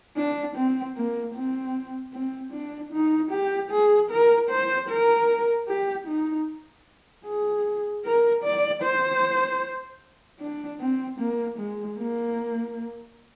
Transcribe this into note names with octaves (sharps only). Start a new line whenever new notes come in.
D4
C4
A#3
C4
C4
D4
D#4
G4
G#4
A#4
C5
A#4
G4
D#4
G#4
A#4
D5
C5
D4
C4
A#3
G#3
A#3